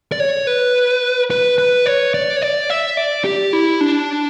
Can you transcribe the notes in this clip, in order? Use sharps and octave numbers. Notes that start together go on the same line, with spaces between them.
D5
C#5
B4
B4
B4
C#5
D5
C#5
D5
E5
D5
G4
E4
D4